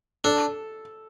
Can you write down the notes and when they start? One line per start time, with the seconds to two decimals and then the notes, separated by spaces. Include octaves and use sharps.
0.24 D4 A4